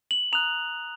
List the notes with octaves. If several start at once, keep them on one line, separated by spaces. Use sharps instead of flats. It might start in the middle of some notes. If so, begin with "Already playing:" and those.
F#7
A#5 D#6 F#6 F7